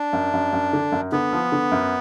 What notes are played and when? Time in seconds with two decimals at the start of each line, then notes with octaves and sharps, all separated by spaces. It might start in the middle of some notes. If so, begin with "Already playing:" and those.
Already playing: D4
0.13 F#2
0.33 F#2
0.53 F#2
0.73 D3
0.92 F#2
1.12 D3 B3
1.33 F3
1.52 D3
1.72 F#2